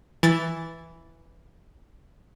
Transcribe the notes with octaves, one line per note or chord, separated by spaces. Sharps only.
E3 A6